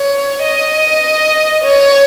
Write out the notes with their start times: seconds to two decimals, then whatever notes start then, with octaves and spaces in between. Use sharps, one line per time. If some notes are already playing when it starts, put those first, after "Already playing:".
Already playing: C#5
0.43 D#5
1.63 C#5